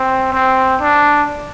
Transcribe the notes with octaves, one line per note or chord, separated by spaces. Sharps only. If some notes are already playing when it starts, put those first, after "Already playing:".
Already playing: C4
C4
D4